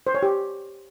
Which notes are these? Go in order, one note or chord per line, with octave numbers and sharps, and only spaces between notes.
C5
C#5
G4